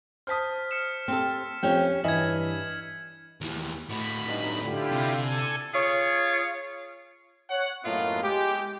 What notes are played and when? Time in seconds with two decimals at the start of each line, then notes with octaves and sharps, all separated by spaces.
0.27 C5 A5 D#6 F6 B6
0.71 F6 C#7 E7
1.08 C4 G4 A4
1.63 F2 C#4 G4 G5
2.04 G2 E3 D#5 E5 G#5 G#6 F#7
3.41 D#2 E3
3.89 A2 F#4 B5
4.27 G2 A3 D#4
4.62 D3 E4 F4 G4
4.92 C3
5.22 A4 G#5
5.74 F4 G#4 C#5
7.50 C#5 F#5
7.83 F#2 A2 A#3 B3 F4 D#5
8.22 G#3 G4